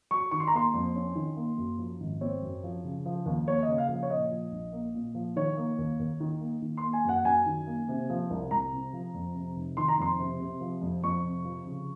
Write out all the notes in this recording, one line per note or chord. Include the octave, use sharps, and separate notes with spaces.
F#3 C#6
D#3 C#6
C6
A#5
A#3 C6
F2
C#4
D#3
A#3
F#2
F3
G#1
C4 C#5
F#2
F3
C#3
F3
D#2
A#3 C#5
C#3 D#5
F5
F3
C#5
A#2 D#5
F3
A#1
A#3
A#2
F3
D#3 C#5
A#3
D#2
D#2
D#3
A#3
D#3
C6
A#3
G#5
F#2 F#5
F#2 G#5
D#3
A#3
C3
F3
C2
C2 A#5
C3
F3
F2
C3
F1
D#3 C6
A#5
F2 C6
C3
C3
F3
F2
F2 C#6
C3
F3
C#3